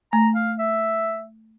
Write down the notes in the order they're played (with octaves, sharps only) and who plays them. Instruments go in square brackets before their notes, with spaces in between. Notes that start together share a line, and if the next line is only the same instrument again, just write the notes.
[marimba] A3 [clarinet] A#5
[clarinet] F5
E5